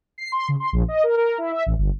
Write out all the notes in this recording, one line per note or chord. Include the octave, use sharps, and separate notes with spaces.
C7
C6
C#3
C6
A#1
D#5
A#4
A#4
E4
E5
A1
G1